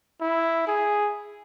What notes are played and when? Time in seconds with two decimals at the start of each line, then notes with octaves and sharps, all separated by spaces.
0.21 E4
0.68 G#4